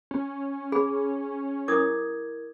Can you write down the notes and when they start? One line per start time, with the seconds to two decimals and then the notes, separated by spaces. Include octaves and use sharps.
0.11 C#4
0.72 G#4 B5
1.68 E4 A#4 D6 D#6 G#6